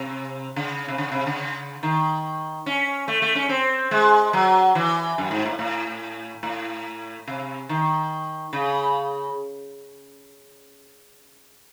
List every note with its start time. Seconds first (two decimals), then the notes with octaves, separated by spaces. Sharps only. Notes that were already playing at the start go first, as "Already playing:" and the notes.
Already playing: C3
0.56 C#3
0.88 C3
0.98 C#3
1.12 C3
1.26 C#3
1.83 D#3
2.66 C#4
3.08 A3
3.22 A3
3.35 C#4
3.49 C4
3.91 G#3
4.33 F#3
4.75 E3
5.18 F#2
5.31 G#2
5.46 A2
5.59 A2
6.43 A2
7.27 C3
7.69 D#3
8.53 C#3